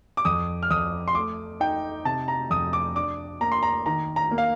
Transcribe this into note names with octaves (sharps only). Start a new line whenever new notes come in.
D6
F2 D#6
F6
F2 D#6
C6
A3 D6
D#4 G5
C3 A5
A#5
F2 D#6
D6
D4 D6
A#3 A#5
C6
A#5
D#3 A#5
A#5
A#3
F5